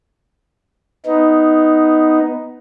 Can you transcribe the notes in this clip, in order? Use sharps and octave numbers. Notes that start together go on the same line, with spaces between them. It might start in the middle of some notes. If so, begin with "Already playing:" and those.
B3 D#4